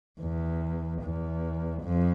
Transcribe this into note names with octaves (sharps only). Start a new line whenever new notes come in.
E2
E2
F2